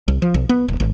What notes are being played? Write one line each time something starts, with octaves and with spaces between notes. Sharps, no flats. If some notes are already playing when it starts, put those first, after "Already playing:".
C2
F3
B1
B3
D#1
G#1